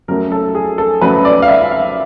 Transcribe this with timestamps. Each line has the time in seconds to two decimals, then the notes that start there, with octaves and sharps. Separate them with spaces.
0.08 F#2 C#3 F#3 A3 A#4
0.32 A4
0.55 G#4
0.78 A4
1.01 F#2 C#3 F#3 A3 B4
1.25 D5
1.42 F5
1.48 E5
1.71 F5